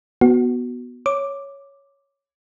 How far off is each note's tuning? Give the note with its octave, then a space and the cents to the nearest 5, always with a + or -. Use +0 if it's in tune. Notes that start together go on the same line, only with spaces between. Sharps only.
B3 -10 F#4 +0
C#5 +0 D6 +0